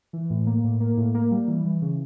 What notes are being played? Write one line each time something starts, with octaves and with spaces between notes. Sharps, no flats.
E3
A2
A#3
A2
A#3
A2
A#3
G3
E3
E3
C#3